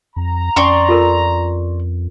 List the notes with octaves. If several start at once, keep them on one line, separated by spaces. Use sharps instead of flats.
F2 A#5
F2 C#4 D5 G#5 C6 C#6
F4 A4 A#4